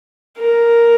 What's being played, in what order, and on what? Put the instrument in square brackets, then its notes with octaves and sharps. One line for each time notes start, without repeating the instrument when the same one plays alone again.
[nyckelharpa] A#4